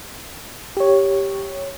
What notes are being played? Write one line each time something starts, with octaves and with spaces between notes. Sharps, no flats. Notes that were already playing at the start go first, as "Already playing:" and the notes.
G4 C#5